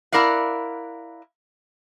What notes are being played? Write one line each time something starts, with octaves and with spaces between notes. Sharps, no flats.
E4 A#4 D5 F5 F#5